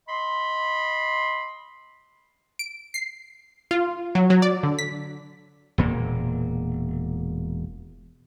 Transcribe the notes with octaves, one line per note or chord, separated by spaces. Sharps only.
D#5 B5 C6
D7
C7
F4
F#3
F#3
D5
D3
B6
E1 A#2 A#3